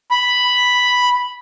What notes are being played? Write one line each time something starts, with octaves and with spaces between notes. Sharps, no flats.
B5